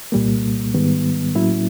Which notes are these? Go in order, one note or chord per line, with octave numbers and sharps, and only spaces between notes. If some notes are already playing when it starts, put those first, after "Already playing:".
C2 A#2 G3 A#3
G#2 D#3 G3 B3
A2 F#3 A#3 C#4 E4